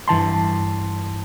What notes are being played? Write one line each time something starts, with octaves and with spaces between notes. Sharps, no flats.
G2 E3 A5 C6